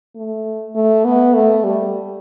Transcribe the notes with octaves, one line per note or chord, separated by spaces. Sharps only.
A3
A3
B3
A3
G3